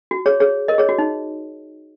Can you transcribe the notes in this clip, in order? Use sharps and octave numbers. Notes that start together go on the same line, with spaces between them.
F#4
G#4 C#5
G#4 C#5
A#4 D#5
G#4 C#5
F#4
D#4